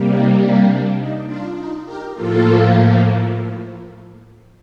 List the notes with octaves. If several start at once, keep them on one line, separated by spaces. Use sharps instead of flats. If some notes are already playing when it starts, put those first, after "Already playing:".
Already playing: C3 G3 A#3
D#4
D4
D4
D#4
D4 F4
D#4
G4 A#4
A2 F3 A#3 F4 A4